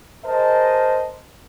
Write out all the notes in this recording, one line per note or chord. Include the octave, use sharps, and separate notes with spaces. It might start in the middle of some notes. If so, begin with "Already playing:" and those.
G#4 A#4 C5 D#5 A5